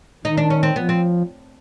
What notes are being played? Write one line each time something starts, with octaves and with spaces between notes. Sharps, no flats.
D#3 D#4
D4
C#4
C4
F3 B3
C4